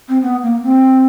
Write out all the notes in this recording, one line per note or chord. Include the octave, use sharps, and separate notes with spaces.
C4
B3
A#3
C4